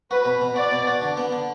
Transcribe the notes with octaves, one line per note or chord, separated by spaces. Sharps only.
F#4 B4
B2
B2
F#4 D5
B2
F#4
D3
B3
D3